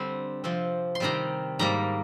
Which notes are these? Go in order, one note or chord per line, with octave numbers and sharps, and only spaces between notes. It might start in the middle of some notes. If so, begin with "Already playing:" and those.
Already playing: D3 G3 C4 C6
C3 F3 C4
C6
C3 D#3 G3 C4 A#5
G#2 G3 A#3 A#5